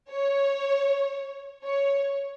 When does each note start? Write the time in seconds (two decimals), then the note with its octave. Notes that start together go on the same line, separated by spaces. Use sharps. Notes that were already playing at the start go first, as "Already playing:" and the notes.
0.11 C#5
1.64 C#5